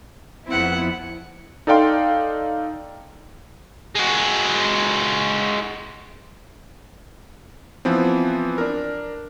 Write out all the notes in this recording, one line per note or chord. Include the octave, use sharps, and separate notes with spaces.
F2 B3 C4 E4 F#5
D#4 A4 D5 F5 G5 C6
G#3 F#4
E3 F3 B3 C4
D4 A#4